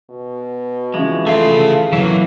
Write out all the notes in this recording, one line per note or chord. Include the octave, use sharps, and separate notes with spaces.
B2
E3 F3 G#3 C#4
A3 F4 G#4 A4 E5 F5
E3 F#3 A#3 B3